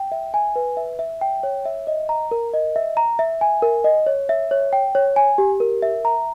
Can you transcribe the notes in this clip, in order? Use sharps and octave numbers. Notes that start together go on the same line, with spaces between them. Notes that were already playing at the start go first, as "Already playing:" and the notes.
Already playing: G5
E5
G#5
B4
E5
E5
G5
C#5
E5
D#5
A#5
A#4
D#5
E5
A#5
E5
G#5
A#4
D#5
C#5
E5
C#5
G5
C#5
G#5
G4
A#4
E5
A#5